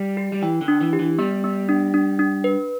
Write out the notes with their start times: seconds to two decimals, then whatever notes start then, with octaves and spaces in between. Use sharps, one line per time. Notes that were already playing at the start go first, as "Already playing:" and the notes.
Already playing: G3
0.17 G4
0.32 G3
0.42 E3 G5
0.61 D3
0.68 D4
0.81 E3
0.93 G4
1.00 E3
1.18 G3 B3
1.44 B3
1.69 D4
1.94 D4
2.19 D4
2.44 B4